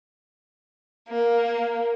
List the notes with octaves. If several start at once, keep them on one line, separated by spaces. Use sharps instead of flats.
A#3